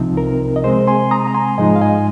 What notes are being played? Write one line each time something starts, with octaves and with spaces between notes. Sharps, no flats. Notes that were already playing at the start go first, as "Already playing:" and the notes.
Already playing: C2 C3 F3 C4 D#4
A#4
D#5
C3 G#3 C4 G#4 C5
G#5 C6
A#5 D#6
A#5
G#5 C6
G#2 F3 G#3 D#4 D#5 G#5
F5
D#5 G#5